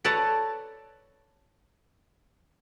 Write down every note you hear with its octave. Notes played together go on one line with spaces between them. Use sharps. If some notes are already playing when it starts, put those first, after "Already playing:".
A4 B4 C#5 D5 A5 A#5